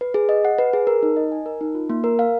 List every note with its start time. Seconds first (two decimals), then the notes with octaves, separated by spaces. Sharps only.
0.01 B4
0.14 G#4
0.29 D#5
0.45 F#5
0.58 B4
0.73 G#4
0.87 A#4
1.03 D#4
1.17 D#5
1.32 G#5
1.46 A#4
1.61 D#4
1.75 F4
1.90 A#3
2.04 A#4
2.19 F5